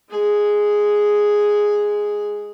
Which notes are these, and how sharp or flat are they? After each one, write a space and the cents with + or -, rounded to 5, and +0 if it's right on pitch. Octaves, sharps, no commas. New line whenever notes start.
G#3 +0 G#4 +0